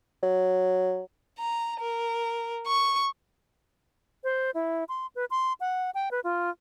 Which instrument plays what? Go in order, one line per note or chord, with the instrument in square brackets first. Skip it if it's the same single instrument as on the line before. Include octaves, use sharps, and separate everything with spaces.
[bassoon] F#3
[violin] A#5
A#4
C#6
[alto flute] C5
E4
C6
B4
C6
F#5
G5
B4
F4